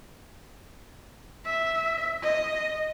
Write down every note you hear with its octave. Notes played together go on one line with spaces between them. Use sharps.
E5
D#5